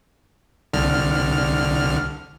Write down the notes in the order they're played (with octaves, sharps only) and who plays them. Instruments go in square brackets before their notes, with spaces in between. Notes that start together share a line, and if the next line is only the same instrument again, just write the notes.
[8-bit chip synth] C2 D3 F6